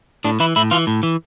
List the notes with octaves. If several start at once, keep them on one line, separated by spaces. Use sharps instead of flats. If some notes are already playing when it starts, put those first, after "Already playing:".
A2 D4
E3 E4
A2 E4
E3 F4
A2
E3